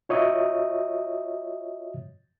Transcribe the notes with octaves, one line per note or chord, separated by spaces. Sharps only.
F4 F#4 C#5 D#5 E5 D#6